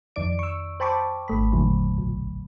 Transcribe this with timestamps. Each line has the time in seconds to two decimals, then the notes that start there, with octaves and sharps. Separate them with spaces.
0.16 F2 D#3 D#4 D5 D7
0.39 C#6 E6
0.80 C5 G5 A5 B5 C#6 D6
1.28 G#1 A3 B5
1.52 E2 A#2 D3 D#3 F#3
1.98 B1